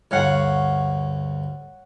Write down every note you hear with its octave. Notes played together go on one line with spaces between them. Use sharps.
D2 G2 C#5 F5 F#5